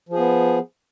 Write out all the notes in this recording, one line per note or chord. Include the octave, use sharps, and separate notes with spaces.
F3 B3 G#4